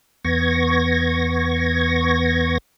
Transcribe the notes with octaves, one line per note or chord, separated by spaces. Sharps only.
E2 B3 C#6 G#6 A#6